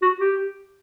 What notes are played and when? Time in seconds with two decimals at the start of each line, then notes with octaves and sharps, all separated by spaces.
0.02 F#4
0.20 G4